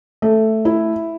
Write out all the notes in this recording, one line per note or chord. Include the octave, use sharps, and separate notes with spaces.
A3
E4